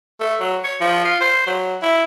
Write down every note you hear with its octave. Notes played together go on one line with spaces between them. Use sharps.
A3
F#3
C#5
F3
F4
C5
F#3
E4